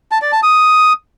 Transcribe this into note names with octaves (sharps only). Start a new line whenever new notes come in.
A5
D5
A5
D#6